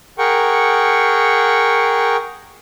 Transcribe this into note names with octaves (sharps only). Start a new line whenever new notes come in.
G#4 A#4 F#5 G5 C#6